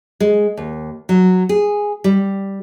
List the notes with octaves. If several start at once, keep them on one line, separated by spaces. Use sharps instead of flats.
G#3
D#2
F#3
G#4
G3